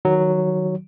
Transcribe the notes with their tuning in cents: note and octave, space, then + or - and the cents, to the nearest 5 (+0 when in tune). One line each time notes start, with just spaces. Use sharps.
D#3 +0 F#3 +0